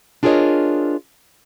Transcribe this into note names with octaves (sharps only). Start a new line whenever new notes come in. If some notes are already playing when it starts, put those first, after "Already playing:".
D4 F4 G#4 A#4 C#5 D#5